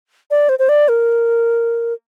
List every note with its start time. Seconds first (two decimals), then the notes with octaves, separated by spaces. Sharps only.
0.31 D5
0.49 C5
0.59 C5
0.69 D5
0.89 A#4